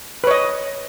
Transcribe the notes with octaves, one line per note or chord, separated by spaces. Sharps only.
B4 C#5 D#5